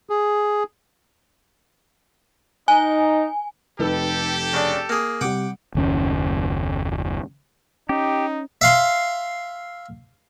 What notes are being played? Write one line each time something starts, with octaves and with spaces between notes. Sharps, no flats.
G#4
D#4 G#5
F1 D#4 G4 A4 B4
C#3 D4
A#3 G#4
C3 G3 F#5 G5 D6
F#1 D#2 C#4
C#4 D#4 G4
E5 F5 C6